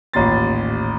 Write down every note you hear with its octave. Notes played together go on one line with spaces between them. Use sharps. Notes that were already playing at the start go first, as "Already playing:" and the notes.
A1 D#2 A#2 C6 A6